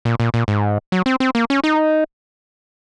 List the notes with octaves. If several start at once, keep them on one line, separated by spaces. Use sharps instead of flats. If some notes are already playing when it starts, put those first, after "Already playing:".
A#2
A#2
A#2
G#2
F#3
C4
C4
A#3
C#4
D#4